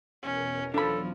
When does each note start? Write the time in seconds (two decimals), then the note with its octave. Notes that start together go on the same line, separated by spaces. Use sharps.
0.22 E2 B2 C#4 A#4
0.74 E2 F3 F#3 D4 A4 B5